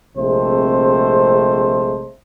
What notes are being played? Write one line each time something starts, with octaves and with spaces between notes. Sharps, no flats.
A#1 C3 G#3 A3 C4 C5